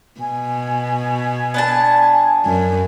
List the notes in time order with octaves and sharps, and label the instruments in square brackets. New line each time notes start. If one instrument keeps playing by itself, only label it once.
[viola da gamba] B2 [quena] G#5
[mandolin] B3 D4 A5
[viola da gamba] F#2